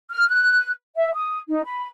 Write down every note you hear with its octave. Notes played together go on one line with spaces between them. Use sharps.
F6
F#6
E5
D#6
D#4
B5